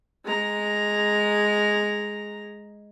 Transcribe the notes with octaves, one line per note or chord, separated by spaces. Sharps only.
G#3 A#5